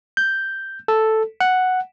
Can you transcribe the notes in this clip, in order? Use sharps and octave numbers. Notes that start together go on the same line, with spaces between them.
G6
A4
F#5